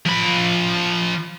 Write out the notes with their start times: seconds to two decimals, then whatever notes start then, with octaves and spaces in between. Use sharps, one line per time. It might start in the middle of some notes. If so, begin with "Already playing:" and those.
0.06 F3 B5